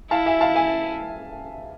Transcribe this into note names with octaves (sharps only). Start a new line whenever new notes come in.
E4 F5 A5
E5 G#5
F5 A5
E5 G#5